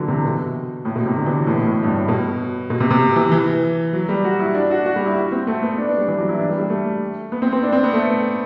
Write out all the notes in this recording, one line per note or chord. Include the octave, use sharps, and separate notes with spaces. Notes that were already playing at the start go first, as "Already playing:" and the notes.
Already playing: D3 E3 F#3
C3
B2
A2
B2
C3
D3
E3
A2
B2
A2
G2
A2
B2
B2
C3
C3
E3
E3
F#3
G3
F#4
E4
D4
F#4
F#4
G3
E4
F#4
C4
A3
B3
D4
D4
G3
E3
F#3
E4
D4
G3
G3
A3
B3
C4
C4
D4
C4
B3
A3